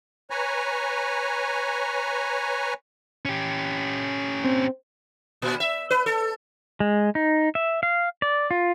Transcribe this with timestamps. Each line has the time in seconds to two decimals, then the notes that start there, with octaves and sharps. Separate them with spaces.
0.30 B4 C#5 G#5 A#5
3.25 C#4 G4
4.44 C4
5.42 A#2
5.60 E5
5.91 B4
6.06 A4
6.80 G#3
7.15 D#4
7.55 E5
7.83 F5
8.22 D5
8.51 F4